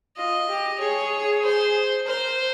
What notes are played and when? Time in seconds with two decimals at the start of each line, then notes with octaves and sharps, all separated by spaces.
0.17 F4 D#5
0.49 G4
0.80 G#4 C#5
1.43 C5
2.06 A#4 C5